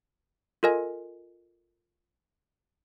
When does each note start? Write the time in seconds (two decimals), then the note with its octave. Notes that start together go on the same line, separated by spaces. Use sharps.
0.63 F4 A4 A#4 D#5 G#5